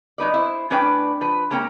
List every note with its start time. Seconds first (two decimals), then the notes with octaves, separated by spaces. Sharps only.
0.18 F#3 D#4 B4 D5
0.34 E4 C5
0.70 A2 C#4 D4 B4 D5 G5
1.21 F3 B4
1.50 G#3 A#3 C#4 C#5 G5 A#5